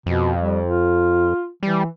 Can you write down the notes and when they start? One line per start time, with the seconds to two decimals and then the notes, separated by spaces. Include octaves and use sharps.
0.06 F2 B2
0.41 G3
0.64 F4
1.63 E3 G3